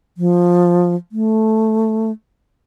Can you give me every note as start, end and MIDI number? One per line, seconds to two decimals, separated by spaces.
0.17 0.95 53
1.12 2.11 57